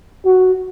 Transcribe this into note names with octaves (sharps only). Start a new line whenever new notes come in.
F#4